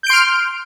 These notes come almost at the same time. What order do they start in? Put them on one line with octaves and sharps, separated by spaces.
G6 D7 C6 F6